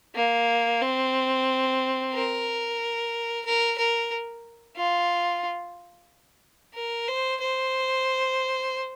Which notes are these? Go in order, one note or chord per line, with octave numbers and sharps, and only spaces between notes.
A#3
C4
A#4
A#4
A#4
F4
A#4
C5
C5